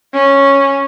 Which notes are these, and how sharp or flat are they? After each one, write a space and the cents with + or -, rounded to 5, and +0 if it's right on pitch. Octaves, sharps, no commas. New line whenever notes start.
C#4 -5